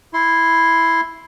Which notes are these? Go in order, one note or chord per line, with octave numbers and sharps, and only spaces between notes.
E4 C6